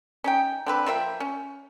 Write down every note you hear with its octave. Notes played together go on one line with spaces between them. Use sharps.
C#4 D#4 G5
D3 C4 B4
F3 A#3 E5 G5
C#4